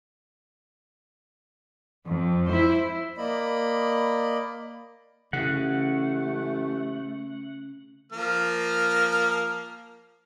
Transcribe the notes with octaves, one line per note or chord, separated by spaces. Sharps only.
F2
E4 C5
A#3 D5 D#5 B5
A1 C#3 A3 F#5
F3 A#3 F6